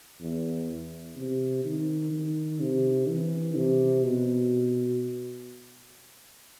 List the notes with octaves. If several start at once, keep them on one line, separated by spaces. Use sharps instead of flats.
E2
C3
D#3
D#3
C3
E3
C3
B2